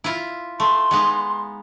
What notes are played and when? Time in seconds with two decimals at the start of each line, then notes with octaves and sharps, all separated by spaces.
0.04 E4 F4
0.60 A3 C6
0.91 G#3 B3 D#4